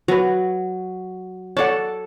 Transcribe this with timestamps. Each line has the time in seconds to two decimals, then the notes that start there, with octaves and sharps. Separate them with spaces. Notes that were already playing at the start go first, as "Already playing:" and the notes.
0.08 F#3 F#4 B4
1.57 A4 C#5 D5 F#5 A5